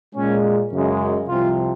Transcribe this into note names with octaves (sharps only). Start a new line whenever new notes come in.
A#2 G#3 C#4
F#2 C#3 G#3
C2 C3 F3 F4